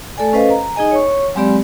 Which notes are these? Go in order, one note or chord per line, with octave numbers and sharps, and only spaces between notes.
A3 A4 D5 G#5
C#4 A4 B4 C5 D#5 F5
A#5
D#4 G#4 D#5 G#5
C#5 C#6
F#3 G#3 C4 G4 D5 B5